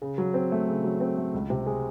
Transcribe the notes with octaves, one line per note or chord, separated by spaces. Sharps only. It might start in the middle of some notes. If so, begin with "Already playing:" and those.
C#3
F#3
C4
A3
C#3
F#3
C4
A3
C#2
C3
G#3